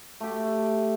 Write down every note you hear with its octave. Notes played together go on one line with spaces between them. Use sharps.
A3 G4